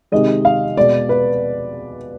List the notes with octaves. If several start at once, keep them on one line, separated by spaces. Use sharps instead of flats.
C3 D#3 G#3 D#5
F5
B2 G#3 D5
B4